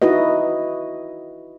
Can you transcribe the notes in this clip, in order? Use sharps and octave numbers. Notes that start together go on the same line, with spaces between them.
D#4 E4 F#4 B4 D#5